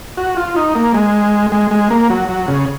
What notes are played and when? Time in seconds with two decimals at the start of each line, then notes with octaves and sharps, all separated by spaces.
0.17 F#4
0.37 F4
0.56 D#4
0.75 A#3
0.94 G#3
1.52 G#3
1.71 G#3
1.90 A#3
2.10 F#3
2.29 F#3
2.48 C#3